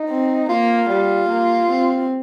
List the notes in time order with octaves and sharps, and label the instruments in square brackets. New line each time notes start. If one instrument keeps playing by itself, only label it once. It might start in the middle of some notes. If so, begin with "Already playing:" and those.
Already playing: [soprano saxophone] D#4
[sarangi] C4
[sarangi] A#3 [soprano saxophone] F4
[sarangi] G3
A#3
C4